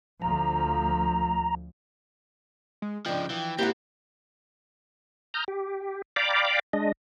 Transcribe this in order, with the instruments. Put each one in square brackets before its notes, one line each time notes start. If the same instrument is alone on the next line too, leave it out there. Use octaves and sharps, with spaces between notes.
[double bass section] D2 F3 [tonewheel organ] A#5
[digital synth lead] G#3
[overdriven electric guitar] C#3 F3 [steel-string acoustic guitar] D4 D#5 [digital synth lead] G5
[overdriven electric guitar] E3 [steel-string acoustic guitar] F3
[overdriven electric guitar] G#2 C4 [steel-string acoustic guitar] A#3 E4 F#4 [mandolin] G4 F#5
[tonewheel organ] A#5 D#6 F6 G6
G4
D5 F5 G5 A#5 B5 D6
G#3 D4 D#5